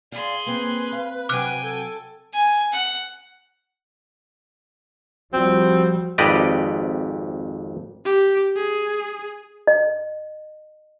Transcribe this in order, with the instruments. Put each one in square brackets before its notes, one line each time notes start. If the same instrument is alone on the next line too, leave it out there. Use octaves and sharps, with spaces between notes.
[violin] G#4 C6 [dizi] D5 [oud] F5
[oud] A#3 C4 [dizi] B4
[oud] F5
[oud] C3 F#3 [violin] G5 G#5 [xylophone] D6 F6 F#6
[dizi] A4
[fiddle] G#5
F#5
[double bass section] F3 G3 [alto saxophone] C4 [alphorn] F#4
[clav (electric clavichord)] G#1 F2 G4 B4 D5 D#5
[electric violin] G4
G#4
[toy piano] D#5